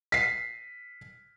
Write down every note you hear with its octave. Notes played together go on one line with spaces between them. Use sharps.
B6 C7